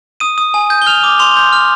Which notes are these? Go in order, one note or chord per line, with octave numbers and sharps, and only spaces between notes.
D#6 D#7
D#6
G#5
G6
G7
F6 F7
D6
C6 F7
G6
F6